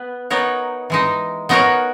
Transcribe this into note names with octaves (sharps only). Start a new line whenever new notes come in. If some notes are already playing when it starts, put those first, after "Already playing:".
Already playing: B3 B4
B3 D#4 A#4 C#5
E3 G#3 D#4
B3 D#4 F#4 A#4 C#5